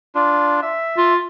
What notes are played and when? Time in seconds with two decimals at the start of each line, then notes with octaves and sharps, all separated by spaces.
0.15 D4 F4
0.62 E5
0.97 F4